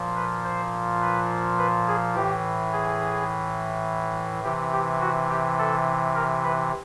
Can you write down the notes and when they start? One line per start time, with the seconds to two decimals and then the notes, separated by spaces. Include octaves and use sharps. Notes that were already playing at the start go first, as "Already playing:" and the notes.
Already playing: A#2 F3
0.16 B4
0.44 C5
1.02 B4
1.59 B4
1.88 G#4
2.15 A2 E3 G4
2.73 G#4
4.44 C3 E3 G4
4.73 G4
5.01 F#4
5.30 G4
5.59 A4
6.15 A#4
6.44 B4